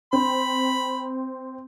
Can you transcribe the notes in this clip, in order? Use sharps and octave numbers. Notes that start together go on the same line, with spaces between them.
C4 B5